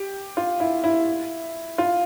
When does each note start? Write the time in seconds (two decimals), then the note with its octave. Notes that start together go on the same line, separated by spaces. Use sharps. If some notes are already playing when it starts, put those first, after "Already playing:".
Already playing: G4
0.37 F4
0.60 E4
0.84 E4
1.78 F4